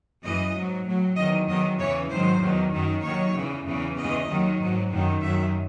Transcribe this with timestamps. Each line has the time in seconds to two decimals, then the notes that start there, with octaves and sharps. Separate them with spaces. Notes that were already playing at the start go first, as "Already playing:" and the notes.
0.23 F#2 E3 D#5
0.54 G#2 F#3
0.85 A2 F#3
1.16 E2 D#3 F#3 D#5
1.48 E2 D#3 F#3 D#5
1.78 E2 C#3 E3 C#5
2.09 G#2 D#3 F#3 C5
2.41 E2 D#3 F#3
2.73 F#2 D#3 F#3
3.03 D#2 D#3 F#3 C#5
3.34 E2 C#3 E3
3.66 E2 C#3 E3
3.96 E2 C#3 E3 D#5
4.28 D#2 D#3 F#3
4.59 G#2 F#3
4.91 F#2 D#3 F#3
5.21 F#2 D#3 F#3 E5